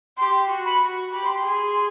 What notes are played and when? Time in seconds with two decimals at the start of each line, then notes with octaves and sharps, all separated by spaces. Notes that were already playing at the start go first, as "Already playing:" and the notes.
0.17 G4 C6
0.49 F#4
0.65 B5
0.81 F#4
1.13 G4 B5
1.24 C6
1.35 C6
1.45 G#4